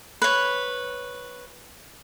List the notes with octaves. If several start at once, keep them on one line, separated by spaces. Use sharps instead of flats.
B4 C#5